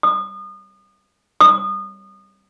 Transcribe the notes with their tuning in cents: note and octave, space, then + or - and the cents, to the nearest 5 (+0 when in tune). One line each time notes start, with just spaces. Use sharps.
D#6 -35
D#6 -30